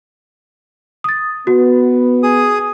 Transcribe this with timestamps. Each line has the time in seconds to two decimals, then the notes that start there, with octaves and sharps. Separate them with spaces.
1.04 D#6 A6
1.47 B3 F#4
2.23 G#4 D#6